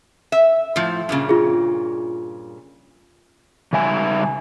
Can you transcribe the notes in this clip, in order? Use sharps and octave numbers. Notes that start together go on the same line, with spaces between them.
E5
A2 F3
G2 A#2 C#3
F4 G#4
C#3 G3 E5 G#5